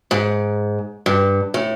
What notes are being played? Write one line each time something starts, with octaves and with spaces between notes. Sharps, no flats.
G#2
G2
A2